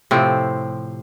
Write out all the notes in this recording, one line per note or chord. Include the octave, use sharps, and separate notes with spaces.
A2 C3 F3 C4